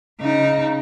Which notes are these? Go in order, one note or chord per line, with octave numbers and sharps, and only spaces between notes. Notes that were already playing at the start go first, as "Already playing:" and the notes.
C#3 D#4